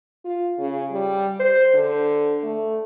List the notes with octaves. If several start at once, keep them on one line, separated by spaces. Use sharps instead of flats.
F4
C#3
G3
C5
D3
A3